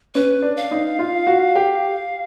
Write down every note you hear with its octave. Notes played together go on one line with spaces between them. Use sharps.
C#4 B4
D4
F5
D#4
F4
F#4
G4